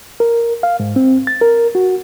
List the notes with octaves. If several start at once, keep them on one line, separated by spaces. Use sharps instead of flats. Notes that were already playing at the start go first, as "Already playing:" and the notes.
A#4
F5
G#2
C4
A6
A#4
F#4